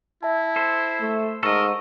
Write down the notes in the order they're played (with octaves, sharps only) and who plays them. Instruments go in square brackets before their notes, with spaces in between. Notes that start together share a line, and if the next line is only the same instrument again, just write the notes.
[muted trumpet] E4 [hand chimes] E5 A5
[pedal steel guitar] A4 C5
[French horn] A3
[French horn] G#2 [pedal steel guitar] A4 D#5 [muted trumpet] A#4 [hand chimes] C#6